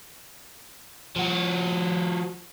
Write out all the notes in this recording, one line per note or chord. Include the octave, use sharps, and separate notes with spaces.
F3 F#4